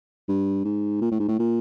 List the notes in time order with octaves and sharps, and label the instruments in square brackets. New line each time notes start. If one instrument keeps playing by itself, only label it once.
[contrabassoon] G2
G#2
A#2
A2
G#2
A2
A#2